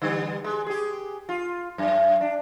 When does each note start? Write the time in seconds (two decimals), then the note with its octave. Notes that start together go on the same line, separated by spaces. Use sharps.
0.02 D3 G3 B3
0.44 G#3
0.67 G4 G#4
1.29 F4
1.78 F#2
2.21 D4